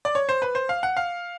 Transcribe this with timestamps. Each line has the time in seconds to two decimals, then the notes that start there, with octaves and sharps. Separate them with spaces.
0.05 D5
0.15 C#5
0.29 C5
0.42 B4
0.55 C5
0.69 F5
0.83 F#5
0.97 F5